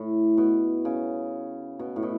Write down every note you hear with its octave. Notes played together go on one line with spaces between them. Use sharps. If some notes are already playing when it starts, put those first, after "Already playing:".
Already playing: A2
B2
C#3
B2
A2
B2